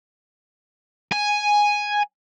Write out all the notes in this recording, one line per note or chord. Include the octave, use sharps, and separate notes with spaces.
G#5